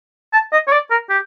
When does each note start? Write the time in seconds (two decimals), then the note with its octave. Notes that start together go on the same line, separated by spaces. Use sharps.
0.33 A5
0.52 D#5
0.67 C#5
0.72 D5
0.90 A#4
1.09 G4